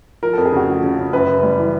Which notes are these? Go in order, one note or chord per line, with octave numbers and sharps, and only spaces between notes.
F3 A#4
F2 A4
G#4
C#3 F#4
F3
C#3
C#3
F#2 B4
C#3
G3
E3